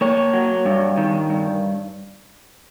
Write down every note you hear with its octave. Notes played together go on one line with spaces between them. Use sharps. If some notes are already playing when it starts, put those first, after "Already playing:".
A#3 C#5
F#3
G2
D#3
G2